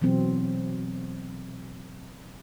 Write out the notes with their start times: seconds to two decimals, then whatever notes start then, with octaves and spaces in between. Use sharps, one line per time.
0.01 B2 E3 F#3 C4